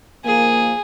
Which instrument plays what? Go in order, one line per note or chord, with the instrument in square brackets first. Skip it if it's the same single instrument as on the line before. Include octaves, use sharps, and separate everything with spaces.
[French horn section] D#3 F3 A#3 [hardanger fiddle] G#4